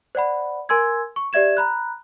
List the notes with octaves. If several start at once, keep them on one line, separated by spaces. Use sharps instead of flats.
C5 D5 F#5 B5
A#4 G#5 C6 E6 G#6
C#6
G4 D5 E5 G#6 E7
A#5 B5 F#6